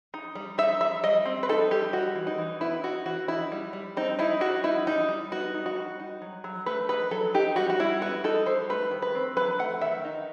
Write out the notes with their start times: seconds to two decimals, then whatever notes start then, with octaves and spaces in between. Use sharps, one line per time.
0.14 D#4
0.35 G3
0.58 D#4 E5
0.81 G3 E5
1.04 G3 D#5
1.25 C4
1.43 B4
1.49 D#4 A4
1.71 G3 G4
1.93 D#4 F#4
2.16 E3
2.27 D#4
2.38 E3
2.61 B3 E4
2.84 D#4 F#4
3.06 E3 F#4
3.28 D#4 E4
3.52 G3
3.73 G3
3.97 C4 D#4
4.19 D#4 E4
4.41 G3 F#4
4.64 D#4 E4
4.87 G3 D#4
5.09 G3
5.32 B3 F#4
5.54 D#4
5.66 F#4
5.76 G3
6.00 D#4
6.22 F#3
6.44 F#3
6.66 A3 B4
6.89 D#4 B4
7.11 F#3 A4
7.34 D#4 G4
7.56 G3 F#4
7.70 F#4
7.80 G3 E4
8.02 B3 F#4
8.24 D#4 A4
8.46 G3 C5
8.70 A3 B4
8.91 D#3
9.02 B4
9.15 C4
9.36 F#3 B4
9.59 A3 F#5
9.81 D#3 E5
10.05 D#4